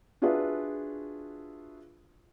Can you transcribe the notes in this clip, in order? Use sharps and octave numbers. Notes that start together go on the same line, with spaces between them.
D4 F4 F#4 G#4 B4 E5